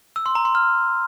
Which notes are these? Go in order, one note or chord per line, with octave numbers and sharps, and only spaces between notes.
E6
C6
A#5
C6
F6